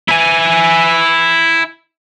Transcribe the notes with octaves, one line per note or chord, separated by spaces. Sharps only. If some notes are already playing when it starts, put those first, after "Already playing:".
E4 G#5